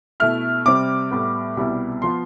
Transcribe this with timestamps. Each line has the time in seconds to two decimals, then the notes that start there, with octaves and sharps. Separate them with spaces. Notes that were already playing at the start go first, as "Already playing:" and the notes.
0.20 B2 A3 E4 F6
0.66 C3 G3 C4 D6
1.11 A2 G3 B3
1.57 C2 B2 G3 B3 E4
2.02 F3 B3 F4 C6